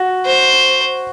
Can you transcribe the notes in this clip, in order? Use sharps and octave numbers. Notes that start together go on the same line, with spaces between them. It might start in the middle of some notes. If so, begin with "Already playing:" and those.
Already playing: F#4
C5